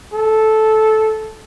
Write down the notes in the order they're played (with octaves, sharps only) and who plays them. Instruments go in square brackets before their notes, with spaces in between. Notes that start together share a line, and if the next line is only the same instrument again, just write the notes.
[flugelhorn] A4